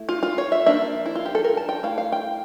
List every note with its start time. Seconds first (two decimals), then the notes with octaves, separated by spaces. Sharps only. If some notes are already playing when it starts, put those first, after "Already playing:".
Already playing: A3 E4
0.09 F4
0.23 F4
0.38 C#5
0.52 E5
0.66 F3 A#3 D4 E5
1.06 E4
1.15 F4
1.26 G4
1.35 A4
1.44 A#4
1.57 A5
1.69 G5
1.83 A3 E4 F5
1.98 F5
2.12 G5